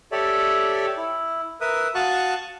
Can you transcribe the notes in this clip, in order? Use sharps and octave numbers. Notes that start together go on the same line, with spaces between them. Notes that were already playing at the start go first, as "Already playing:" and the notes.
G4 A4 C#5 D5 E5
E4
A#4 B4 E5 D#6
F#4 F5 A5 C#6 D#6 F#6